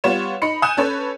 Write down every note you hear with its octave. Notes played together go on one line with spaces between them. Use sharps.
G3 B3 F4 C#5 E7
D#4 B5 C#7
G#5 D#6 F#6 G6 E7
C#4 A4 B4 C#5